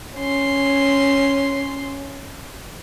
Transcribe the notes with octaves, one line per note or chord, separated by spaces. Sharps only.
C#4 C6